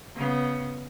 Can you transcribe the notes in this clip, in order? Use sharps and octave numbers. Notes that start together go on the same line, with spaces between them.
C#3 B3